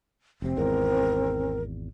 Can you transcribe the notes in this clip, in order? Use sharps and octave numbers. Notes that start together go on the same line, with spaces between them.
F1 C3 C4
G#1 E2 A#4